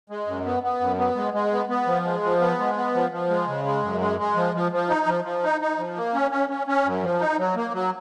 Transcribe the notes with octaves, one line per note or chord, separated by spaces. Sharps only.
G#3
F#2
B3
B3
F#2
B3
G#3
G#3
B3
B3
F3
G#3
F3
B3
G#3
B3
F3
F3
G#3
C#3
G#3
F#2
G#3
G#3
F3
F3
F3
D#4
F3
F3
D#4
D#4
F3
A#3
C#4
C#4
C#4
C#4
F#2
F3
D#4
F#3
A#3
F#3